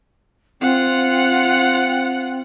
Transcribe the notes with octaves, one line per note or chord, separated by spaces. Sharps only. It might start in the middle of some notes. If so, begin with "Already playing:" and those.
C4 F4 F#5